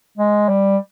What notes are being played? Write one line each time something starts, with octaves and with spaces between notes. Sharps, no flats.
G#3
G3